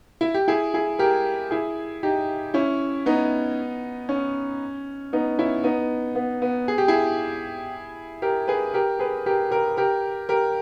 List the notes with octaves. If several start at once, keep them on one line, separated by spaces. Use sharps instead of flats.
E4
G4
E4 G#4
E4 G#4
G4 A#4
E4 G#4
D#4 G4
C#4 E4
B3 D#4
C#4
B3 D#4
C#4 E4
B3 D#4
B3
B3
G#4
G4
E4 G#4
G4 A#4
G#4 B4
G4 A#4
G#4 B4
G4 A#4
G4 A#4
G4 A#4
G4 A#4